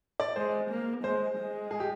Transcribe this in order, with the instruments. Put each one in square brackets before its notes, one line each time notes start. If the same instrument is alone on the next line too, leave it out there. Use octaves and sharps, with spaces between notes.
[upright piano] D5
[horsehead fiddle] G#3 [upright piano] C5
[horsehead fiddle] A#3
[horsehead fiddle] G#3 [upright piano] C5
[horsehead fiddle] G#3
[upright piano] G#4
G4